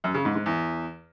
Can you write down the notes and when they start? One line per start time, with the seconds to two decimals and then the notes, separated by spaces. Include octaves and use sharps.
0.04 F#2
0.14 C#3
0.25 G#2
0.35 G#2
0.46 E2